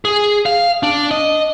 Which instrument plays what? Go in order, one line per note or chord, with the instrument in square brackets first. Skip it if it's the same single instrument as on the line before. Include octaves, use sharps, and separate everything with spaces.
[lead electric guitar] G#4
F5
D4
D#5